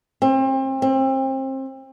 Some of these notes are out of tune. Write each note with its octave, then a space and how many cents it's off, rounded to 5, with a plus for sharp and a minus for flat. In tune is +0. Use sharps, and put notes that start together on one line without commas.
C4 +35
C4 +30